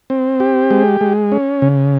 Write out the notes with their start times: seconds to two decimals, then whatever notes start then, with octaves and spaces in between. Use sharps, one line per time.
0.10 C4
0.40 G4
0.71 G#3
1.01 G#3
1.32 C#4
1.62 C#3